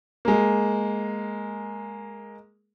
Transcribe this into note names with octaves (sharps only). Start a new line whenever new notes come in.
G#3 A#3